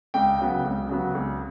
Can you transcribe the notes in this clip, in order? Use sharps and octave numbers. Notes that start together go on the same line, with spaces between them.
C#2 G5
C#3 F#3 B3
C#2
C#3 F#3 B3
C#2